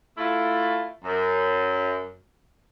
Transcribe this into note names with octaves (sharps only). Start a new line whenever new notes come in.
A3 E4 F4
F#2